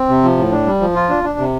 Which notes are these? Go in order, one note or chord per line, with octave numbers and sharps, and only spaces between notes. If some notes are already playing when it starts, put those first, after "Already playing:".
Already playing: C4
C3
F3
A2
D4
G3
F3
F4
D4
D4
C3